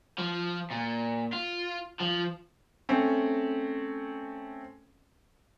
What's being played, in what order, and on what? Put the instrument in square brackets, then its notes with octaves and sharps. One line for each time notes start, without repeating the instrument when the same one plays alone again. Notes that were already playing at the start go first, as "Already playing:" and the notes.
[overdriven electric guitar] F3
A#2
F4
F3
[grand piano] A3 C4 C#4